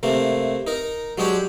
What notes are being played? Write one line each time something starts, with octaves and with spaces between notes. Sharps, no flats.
C3 A3 A#3
D#4 A#4
F#3 G#3 D4 G4 C#5